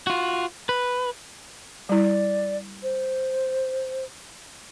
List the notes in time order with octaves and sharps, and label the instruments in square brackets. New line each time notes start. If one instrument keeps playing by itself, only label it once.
[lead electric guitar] F4 F#4
B4
[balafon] G3 E4 [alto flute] D5
[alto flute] C5